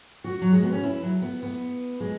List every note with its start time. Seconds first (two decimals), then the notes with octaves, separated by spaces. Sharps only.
0.24 F#4
0.41 F#3
0.52 G#3
0.63 B3
0.73 C#4
0.83 E4
1.03 F#3
1.22 B3
1.43 B3
2.00 G#3